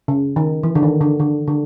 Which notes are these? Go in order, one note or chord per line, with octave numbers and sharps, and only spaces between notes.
C#3
D#3
E3
D3
D#3
D3
D3
D3